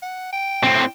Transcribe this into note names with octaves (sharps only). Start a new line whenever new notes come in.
F#5
G5
A2 C4